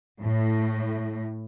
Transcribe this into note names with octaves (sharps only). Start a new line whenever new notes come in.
A2